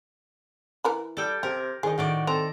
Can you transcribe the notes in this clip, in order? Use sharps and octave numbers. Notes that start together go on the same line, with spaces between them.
E3 A#4 B5
G3 A4 G5
C3 G4 A#4
C2 D#3 G#4 D#5
A2 D#3 F#4 D5
C4 A4 A#5